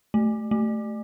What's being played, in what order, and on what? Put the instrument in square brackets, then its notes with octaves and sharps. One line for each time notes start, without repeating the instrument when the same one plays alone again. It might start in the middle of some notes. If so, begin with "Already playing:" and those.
[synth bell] A3
A3